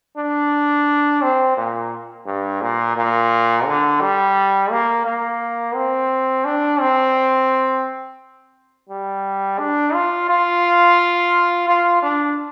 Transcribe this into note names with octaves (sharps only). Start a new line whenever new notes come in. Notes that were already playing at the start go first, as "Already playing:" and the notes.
D4
C4
A#2
G2
A#2
A#2
D3
G3
A#3
A#3
C4
D4
C4
G3
D4
F4
F4
F4
D4